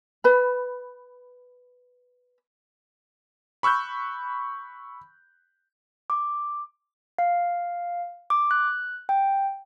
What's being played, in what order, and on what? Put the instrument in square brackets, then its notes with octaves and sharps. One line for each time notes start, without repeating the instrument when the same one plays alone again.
[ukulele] B4 B5
[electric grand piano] B5 C#6 E6 F#6 G6
[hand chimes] D6
[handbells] F5
D6
F#6
G5